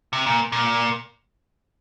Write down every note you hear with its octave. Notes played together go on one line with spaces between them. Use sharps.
C3
A#2
A#2